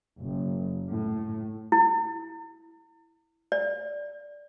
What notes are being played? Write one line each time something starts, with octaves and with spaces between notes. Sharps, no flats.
F#1
A2
E4
D5